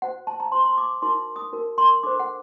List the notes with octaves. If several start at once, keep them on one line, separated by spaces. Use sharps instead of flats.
F#4 C5 F#5
A5
A#5
F#4 C5 C6
C6
D6
D#4 F#4 A#4 C6
D#6
D#4 F#4 A#4
C6
D4 A4 C5 D6
F#5